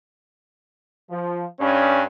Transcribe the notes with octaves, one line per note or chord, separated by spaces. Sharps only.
F3
G2 C#4